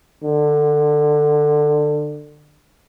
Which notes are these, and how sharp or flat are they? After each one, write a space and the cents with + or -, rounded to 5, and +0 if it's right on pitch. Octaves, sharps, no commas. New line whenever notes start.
D3 +20